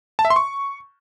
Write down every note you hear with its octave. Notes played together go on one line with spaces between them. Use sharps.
A5
E5
C6
C#6